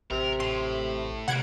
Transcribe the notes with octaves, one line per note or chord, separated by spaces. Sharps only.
A1 C3 A#4
A2 C6
C#2 C3 A#3 F#5 G#6 D7